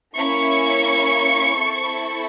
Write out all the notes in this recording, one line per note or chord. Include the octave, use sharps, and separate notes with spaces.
A#3 C#4 E4 C#6
C4 E4 A4